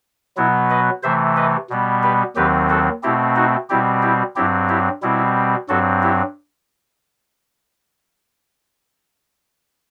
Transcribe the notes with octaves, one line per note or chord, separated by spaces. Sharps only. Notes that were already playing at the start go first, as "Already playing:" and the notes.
B2 F#3 B3 E4
B4 D#5
C3 E3 A3 C5 E5
B4 D#5
B2 G3 B3
G4 B4
D#2 D#3 F#3 C4 G4 B4
F#4 A4
B2 A3 C4 E4 G4
D#4 F#4
B2 G3 C4 E4 G4
E4 G4
G2 F#3 C4 E4 G4
E4 G4
B2 G3 C4 E4
G2 F#3 C4 F#4 A4
E4 G4